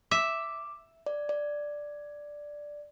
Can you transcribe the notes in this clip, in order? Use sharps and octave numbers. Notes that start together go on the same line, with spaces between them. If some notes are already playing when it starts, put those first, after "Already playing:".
E5 D6
D5
D5